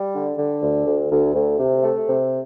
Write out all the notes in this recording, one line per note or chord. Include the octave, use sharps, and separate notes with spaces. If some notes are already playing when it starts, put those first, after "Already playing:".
Already playing: G3
D3
D3
D2
D2
D2
D2
C3
A3
C3